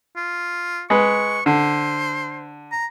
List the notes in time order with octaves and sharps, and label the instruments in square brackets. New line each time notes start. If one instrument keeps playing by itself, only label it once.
[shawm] F4
[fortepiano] G#3 B4 [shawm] C#6
[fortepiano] D3 [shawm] C5
[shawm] A#5